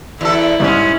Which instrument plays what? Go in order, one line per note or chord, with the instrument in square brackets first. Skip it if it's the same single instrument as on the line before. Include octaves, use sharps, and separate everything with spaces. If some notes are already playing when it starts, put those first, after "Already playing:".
[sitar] E2 A4 [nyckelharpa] E4
[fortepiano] C2 G#2 [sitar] G#3 C#4